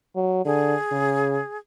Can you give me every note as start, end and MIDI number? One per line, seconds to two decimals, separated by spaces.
0.16 0.44 54
0.45 0.75 50
0.45 1.57 68
0.92 1.40 49